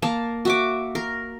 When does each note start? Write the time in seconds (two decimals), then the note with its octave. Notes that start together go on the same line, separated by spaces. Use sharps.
0.02 A#3 A5
0.45 F#4 E5 D6
0.95 A#4